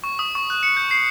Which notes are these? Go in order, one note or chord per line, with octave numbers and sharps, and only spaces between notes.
C#6
D#6
C#6
F#6
C#7
G6
C7